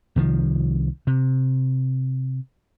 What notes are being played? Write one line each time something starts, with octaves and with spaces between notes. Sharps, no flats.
C2 D#3 F3
C3